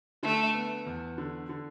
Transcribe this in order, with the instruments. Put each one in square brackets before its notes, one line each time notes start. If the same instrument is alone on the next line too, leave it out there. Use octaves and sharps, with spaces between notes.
[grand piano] D3 [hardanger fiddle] A3
[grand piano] B3
E2
D3
D3